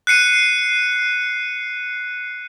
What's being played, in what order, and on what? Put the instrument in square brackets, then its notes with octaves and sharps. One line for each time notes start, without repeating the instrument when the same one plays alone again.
[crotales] F#6 C7 C#7 D#7